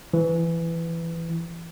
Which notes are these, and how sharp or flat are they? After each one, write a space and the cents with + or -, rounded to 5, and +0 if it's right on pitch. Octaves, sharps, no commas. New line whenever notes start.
E3 +15